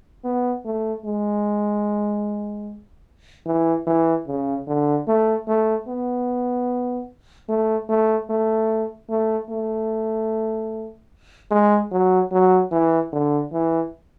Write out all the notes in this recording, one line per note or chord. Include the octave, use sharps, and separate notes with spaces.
B3
A3
G#3
E3
E3
C#3
D3
A3
A3
B3
A3
A3
A3
A3
A3
G#3
F#3
F#3
E3
D3
E3